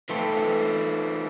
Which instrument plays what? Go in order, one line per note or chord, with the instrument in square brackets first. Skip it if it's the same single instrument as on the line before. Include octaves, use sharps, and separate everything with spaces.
[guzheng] A3 C4 [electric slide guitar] D#4 F4 B4